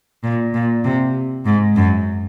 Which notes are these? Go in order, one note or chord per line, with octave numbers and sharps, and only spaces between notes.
A#2
A#2
C3
G#2
F#2